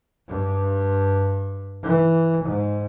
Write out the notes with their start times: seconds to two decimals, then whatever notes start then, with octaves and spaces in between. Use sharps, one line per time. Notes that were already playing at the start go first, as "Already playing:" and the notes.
0.28 G2
1.83 E3
2.44 G#2